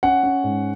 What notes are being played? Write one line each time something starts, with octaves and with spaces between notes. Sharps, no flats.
C#4 F#5
C#4
G#2